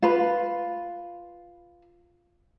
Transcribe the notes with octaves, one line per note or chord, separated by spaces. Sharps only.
F4 B4